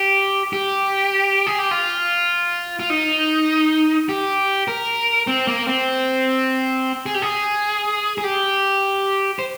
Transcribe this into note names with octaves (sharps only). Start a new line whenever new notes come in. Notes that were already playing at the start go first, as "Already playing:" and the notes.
Already playing: G4
G4
G#4
G4
F4
F4
D#4
G4
A#4
C4
A#3
C4
G#4
G4
G#4
G#4
G4
C5